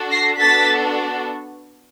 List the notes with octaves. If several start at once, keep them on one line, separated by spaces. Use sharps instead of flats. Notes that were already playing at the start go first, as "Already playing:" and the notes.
Already playing: D4 F#4 A4
A#6 C7
B3 D4 F#4 A4 A6 B6